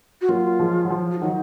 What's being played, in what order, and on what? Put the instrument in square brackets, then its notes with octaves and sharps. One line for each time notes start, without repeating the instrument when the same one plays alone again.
[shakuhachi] F#4
[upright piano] F#3 A#3 [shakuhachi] F4
[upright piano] F3 G#3
F#3
F3
[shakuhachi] F4
[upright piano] D#3 F#3 [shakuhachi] D#4